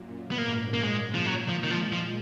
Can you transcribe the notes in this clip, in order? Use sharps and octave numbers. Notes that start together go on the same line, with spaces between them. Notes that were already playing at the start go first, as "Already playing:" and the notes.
Already playing: F#2 A#2
B3
G#2 A#3
A#3
G#2 G#3
F3
A#2 F#3
F3
D#3
F3 G#3
F3